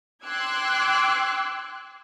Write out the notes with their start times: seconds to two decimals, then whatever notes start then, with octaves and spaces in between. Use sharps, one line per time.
0.24 G5 C6 D6 E6 F#6 G#6